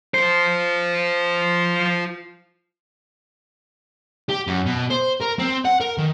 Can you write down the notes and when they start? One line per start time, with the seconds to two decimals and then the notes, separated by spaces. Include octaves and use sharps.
0.14 F4 C5
4.30 G4
4.47 F#2
4.66 B2
4.90 C5
5.22 A#4
5.39 C4
5.65 F#5
5.80 A#4
5.98 D#3